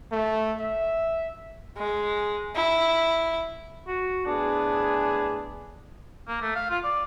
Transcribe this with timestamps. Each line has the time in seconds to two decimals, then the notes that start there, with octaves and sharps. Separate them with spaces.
0.12 A3
0.60 E5
1.77 G#3
2.55 E4
3.88 F#4
4.26 A2 B3 D4 G#4
6.28 A#3
6.42 A3
6.56 F5
6.70 F4
6.84 D5